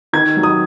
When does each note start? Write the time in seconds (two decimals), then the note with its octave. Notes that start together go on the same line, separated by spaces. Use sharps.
0.13 D#3 G#6
0.36 F#3
0.43 D#6